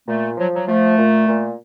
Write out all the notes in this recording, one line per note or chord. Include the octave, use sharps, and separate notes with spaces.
A#2 A3
F3 F#3
F#3
F3 A3
A#2
A#2